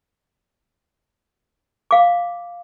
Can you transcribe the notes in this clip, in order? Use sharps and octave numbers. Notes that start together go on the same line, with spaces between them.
F5 D6